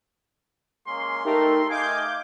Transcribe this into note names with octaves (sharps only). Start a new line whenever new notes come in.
G#3 A#3 C#4 C6
A3 D#4 G4 A#4
A3 D#5 F5 G#5 D6 G6